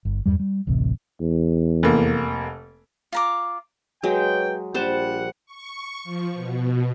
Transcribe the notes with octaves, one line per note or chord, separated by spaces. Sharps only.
G1
E2 G2 G3
G3
D1 A1 C3
E2
F1 A#3
F4 A#5 D6
F#3 G#3 B4 C#5 G5
A#1 G3 C5 F#5 A5
C#6
F3
B2